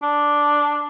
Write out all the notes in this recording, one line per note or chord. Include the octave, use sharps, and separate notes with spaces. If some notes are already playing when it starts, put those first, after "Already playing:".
D4